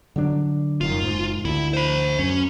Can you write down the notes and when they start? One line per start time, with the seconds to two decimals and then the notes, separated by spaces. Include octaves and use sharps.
0.16 D3 F#3 D4
0.81 F1 F#2 D#3 F4
1.02 F#1 G#2
1.45 D2 E4
1.73 C5 B5
2.19 F#2 C#4